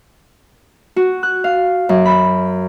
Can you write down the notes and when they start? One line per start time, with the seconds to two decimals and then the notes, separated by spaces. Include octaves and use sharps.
0.96 F#4
1.23 F#6
1.44 F5
1.89 F#2
2.06 B5